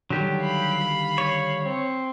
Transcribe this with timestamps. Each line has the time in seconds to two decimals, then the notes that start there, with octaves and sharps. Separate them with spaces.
0.10 D3 D#3 F#3 G3 G4
0.42 F5 B5
1.18 C#5
1.64 C4